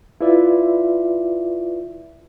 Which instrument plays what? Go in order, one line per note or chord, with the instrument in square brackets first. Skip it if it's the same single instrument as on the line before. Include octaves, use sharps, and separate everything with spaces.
[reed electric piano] E4 F4 B4 D5 E5